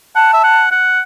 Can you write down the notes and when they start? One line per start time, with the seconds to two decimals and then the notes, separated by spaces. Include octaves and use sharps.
0.16 F#5 A5
0.33 E5
0.44 F#5
0.71 F#5